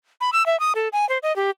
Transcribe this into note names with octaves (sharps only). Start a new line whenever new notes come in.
B5
E6
E5
D#6
A4
G#5
C5
D#5
G4